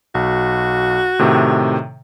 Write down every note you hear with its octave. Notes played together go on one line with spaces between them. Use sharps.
B1 F#4
A2 C3 D#3